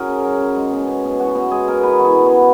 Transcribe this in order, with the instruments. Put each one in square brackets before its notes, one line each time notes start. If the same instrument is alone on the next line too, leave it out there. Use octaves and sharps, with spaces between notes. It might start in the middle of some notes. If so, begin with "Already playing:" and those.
Already playing: [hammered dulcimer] C#4 F#4 G#4 A#4
C#3
F#3
C#3
G#3
B2
C#4
B2
B2 F#4
B2 F#4
G#3 G#4
B2 A#4
B3 B4
E3 F#4
G#4
B3
F#4